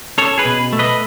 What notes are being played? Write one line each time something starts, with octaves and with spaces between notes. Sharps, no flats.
C#4 A4 C#5
G#4 B4
B2
A3
B4 D#5